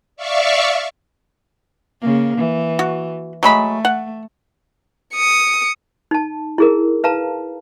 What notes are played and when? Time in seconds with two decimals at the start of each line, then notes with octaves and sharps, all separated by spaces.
0.16 D5 E5 F5 C#6
2.01 C#3 A#3
2.37 E3
2.79 F#4
3.43 F#3 G#3 A3 B5
3.85 F#5
5.14 D#6 C#7
6.11 D#4 A5
6.58 E4 G#4 A#4
7.04 B4 F5 A5 A#5